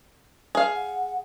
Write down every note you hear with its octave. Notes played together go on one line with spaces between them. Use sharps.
G#4 F5
F#5